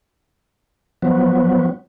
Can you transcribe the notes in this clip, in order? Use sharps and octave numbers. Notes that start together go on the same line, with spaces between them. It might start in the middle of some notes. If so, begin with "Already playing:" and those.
F3 F#3 B3